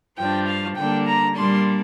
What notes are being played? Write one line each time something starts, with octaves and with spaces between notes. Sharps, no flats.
G2 F3 D4 G5
F5
D3 G3 A#3 D4 G5
A#5
A#2 G3 A#3 D4 C6